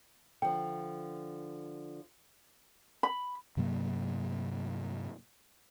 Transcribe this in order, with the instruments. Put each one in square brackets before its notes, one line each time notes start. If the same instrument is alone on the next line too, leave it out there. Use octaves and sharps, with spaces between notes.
[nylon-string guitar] D3 F3 [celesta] G5
[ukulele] B5
[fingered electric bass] G2 C3 F#3 A#3